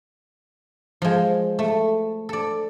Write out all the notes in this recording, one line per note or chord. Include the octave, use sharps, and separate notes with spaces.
F3 G#3
A3
A4 D5